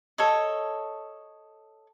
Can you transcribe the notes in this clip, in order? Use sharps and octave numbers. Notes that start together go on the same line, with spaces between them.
A4 C#5 D#5